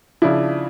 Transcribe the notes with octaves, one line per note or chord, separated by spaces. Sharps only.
C#3 F3 D4 E4